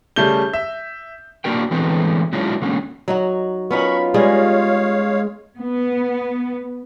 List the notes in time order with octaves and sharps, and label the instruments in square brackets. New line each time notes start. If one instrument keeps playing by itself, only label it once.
[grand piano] C#3 G3 A3 G6 G7
E5
[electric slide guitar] A#3 D4 F#4 A#4 G5
D3 E3 G#3 A3 B3 C4
F#3 G#3 C#4 D4 E4 F4
D3 G#3 A#3 C#4
[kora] F#3 D#4 F#4
[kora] B3 C#4 D#4 [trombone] F4 [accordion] A#4 C#6 [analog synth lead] B5
[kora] G3 G#4 D#5 [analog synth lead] G#3 [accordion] C#5 F5
[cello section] B3